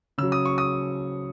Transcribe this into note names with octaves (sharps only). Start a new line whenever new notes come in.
C#3 F#3 E6
D#6
C#6
D#6